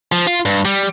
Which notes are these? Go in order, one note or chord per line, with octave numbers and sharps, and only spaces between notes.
F3
F4
G2
G3